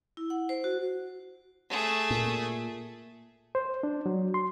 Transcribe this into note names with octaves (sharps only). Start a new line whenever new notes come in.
E4
F#5
C5
F#4
A3 G#4
A#2
C5
D4
F#3
C6